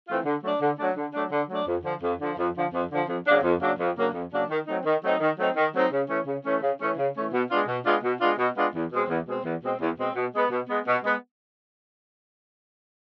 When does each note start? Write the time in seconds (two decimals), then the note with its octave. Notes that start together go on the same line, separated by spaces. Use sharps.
0.08 E3 A3 C4 F4
0.25 D3
0.43 F#3 A3 D4
0.61 D3
0.79 F#3 A3 D4
0.97 D3
1.14 F#3 A3 D4
1.31 D3
1.49 F#3 A3 D4
1.68 F2
1.84 D3 F3
2.03 F2
2.20 D3 F3
2.38 F2
2.56 D3 F3
2.73 F2
2.91 D3 F3
3.08 F2
3.26 C#3 F#3 A#3 D4
3.43 F2
3.61 C#3 F#3 A#3 D4
3.79 F2
3.96 C#3 F#3 A#3 D4
4.14 F2
4.32 C#3 F#3 A#3 D4
4.49 D#3
4.67 F#3 A3 C4 D#4
4.85 D#3
5.03 F#3 A3 C4 D#4
5.20 D#3
5.38 F#3 A3 C4 D#4
5.56 D#3
5.74 F#3 A3 C4 D#4
5.92 C#3
6.08 E3 A3 C#4
6.27 C#3
6.45 E3 A3 C#4
6.62 C#3
6.80 E3 A3 C#4
6.97 C#3
7.15 E3 A3 C#4
7.33 B2
7.50 G#3 B3 D4 F4
7.68 B2
7.86 G#3 B3 D4 F4
8.04 B2
8.21 G#3 B3 D4 F4
8.38 B2
8.56 G#3 B3 D4 F4
8.74 E2
8.91 B2 G#3 C4
9.09 E2
9.27 B2 G#3 C4
9.45 E2
9.63 B2 G#3 C4
9.80 E2
9.97 B2 G#3 C4
10.15 B2
10.34 G#3 B3
10.51 B2
10.69 G#3 B3
10.87 B2
11.03 G#3 B3